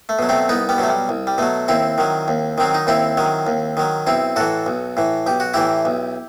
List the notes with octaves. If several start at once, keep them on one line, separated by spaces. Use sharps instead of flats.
A3
B2 F#3
A3 C4
C2 B3 D#4
G3 B3
B2 F#3 A3
G3
C2
G3
B2 F#3 A3
D#2 C4 E4
D#3 F#3
D#2
D#3 F#3 C4
D#4
D#2 C4 E4
D#3 F#3
D#2
D#3 F#3
B1 C4 E4
A2 E3 F#4 A4
B1
A2 E3
B1 G4
F#4
A2 E3 E4 G4
B1